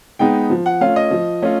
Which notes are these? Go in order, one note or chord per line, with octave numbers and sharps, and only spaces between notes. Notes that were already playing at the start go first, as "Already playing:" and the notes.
G#3 B3 D#4 G5
F3
F#5
A3 C#4 F4 F5
D#5
F3
A3 C#4 F4